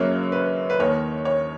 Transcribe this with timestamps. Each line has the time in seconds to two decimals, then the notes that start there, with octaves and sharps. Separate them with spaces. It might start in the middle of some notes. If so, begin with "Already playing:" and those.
Already playing: F#2 C#3 F#3 A#3 C#4 C#5
0.32 B4
0.70 B4
0.79 D#2 D#3 A#3 C#5
1.25 C#5